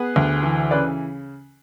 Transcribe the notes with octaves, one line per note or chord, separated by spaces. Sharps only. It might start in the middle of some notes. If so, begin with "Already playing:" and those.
Already playing: B3 G#4 B4
D2
E3
C#3 B4 D5